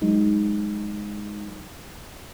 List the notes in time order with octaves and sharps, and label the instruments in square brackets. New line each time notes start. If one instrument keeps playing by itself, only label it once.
[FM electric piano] F#3 G#3 D#4